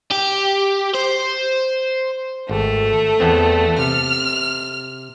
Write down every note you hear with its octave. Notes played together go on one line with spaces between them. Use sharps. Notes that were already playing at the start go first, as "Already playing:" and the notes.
G4
C5
G#1 A3
E2 B3 C4
C3 F6